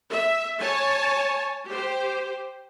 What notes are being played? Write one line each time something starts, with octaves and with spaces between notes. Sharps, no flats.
E5
C#5 G#5 A5
G4 C5